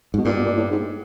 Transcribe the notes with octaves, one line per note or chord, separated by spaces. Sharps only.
G#2 B2
G2 A#2
B2
A#2
A2
G#2